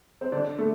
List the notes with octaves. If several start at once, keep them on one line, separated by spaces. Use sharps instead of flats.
C4
D3 D4
A3